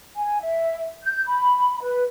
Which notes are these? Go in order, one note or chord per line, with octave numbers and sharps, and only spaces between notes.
G#5
E5
G6
B5
B4